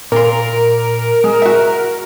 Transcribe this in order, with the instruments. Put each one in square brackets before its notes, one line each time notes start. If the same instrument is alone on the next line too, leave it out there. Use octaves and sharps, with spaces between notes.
[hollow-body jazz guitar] A#2 C6 [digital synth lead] A#4
[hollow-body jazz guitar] G#3
F#4 E5